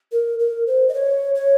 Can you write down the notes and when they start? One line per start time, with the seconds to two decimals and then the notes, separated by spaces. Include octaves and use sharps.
0.12 A#4
0.39 A#4
0.67 C5
0.89 D#5
0.94 C#5
1.35 C#5